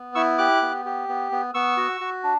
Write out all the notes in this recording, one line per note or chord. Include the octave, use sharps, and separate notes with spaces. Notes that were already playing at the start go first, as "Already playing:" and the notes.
Already playing: B3
E4 C#6 E6
G4 D6 F#6
B3
G4
B3
B3
B3 C#6 E6
F#4
F#4
D4